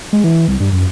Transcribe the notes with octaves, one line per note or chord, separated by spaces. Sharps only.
G#3
E3
C2
G2
F#2